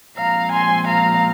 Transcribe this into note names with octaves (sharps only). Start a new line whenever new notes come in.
A#2 F3 G#3 C4 F5 A#5
G#5 C6
F5 A#5